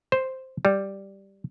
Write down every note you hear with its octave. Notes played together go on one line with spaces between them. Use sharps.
C5
G3